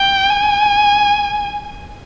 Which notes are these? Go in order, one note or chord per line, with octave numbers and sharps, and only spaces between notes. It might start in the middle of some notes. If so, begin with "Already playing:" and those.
Already playing: G5
G#5